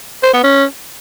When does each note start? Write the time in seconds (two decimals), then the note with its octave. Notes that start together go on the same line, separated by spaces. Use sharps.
0.23 C5
0.33 B3
0.44 C#4